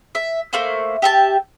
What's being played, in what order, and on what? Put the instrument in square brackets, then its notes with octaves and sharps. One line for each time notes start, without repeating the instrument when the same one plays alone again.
[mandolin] E5
A3 A#3 C5
G4 E5 A5